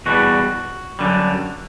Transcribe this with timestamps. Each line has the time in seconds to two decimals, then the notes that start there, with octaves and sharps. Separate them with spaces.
0.06 E2 B2 G3 F#4
0.99 F#2 D3 G3